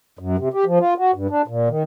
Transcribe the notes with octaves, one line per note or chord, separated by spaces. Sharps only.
F#2
C3
G4
F3
F4
F#4
G2
D4
A#2
D#3